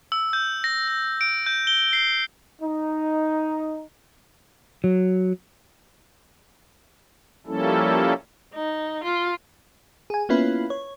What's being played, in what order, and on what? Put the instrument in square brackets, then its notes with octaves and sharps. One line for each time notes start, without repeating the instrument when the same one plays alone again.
[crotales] E6
G6
A#6
A#6
D7
G6
G7
C7
[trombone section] D#4
[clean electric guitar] F#3
[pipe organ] F3 G3 A#3 C#4 E4 A4
[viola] D#4
F4
[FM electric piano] G#4 G#5
A#3 B3 C#4 E4 F4 B4
C#5